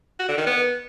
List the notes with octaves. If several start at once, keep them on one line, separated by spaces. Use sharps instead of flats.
F#4
D3
D#3
B3